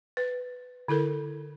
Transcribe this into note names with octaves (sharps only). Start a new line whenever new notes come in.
B4
D3 E4 A4 A#4